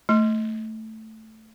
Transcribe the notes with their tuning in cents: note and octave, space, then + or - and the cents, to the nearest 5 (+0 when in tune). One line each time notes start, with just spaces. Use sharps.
A3 +0 C6 +0